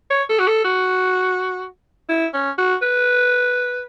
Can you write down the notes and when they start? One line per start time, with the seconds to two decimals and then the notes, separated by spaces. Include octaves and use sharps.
0.10 C#5
0.29 A4
0.39 F#4
0.47 A4
0.64 F#4
2.09 E4
2.33 C#4
2.58 F#4
2.82 B4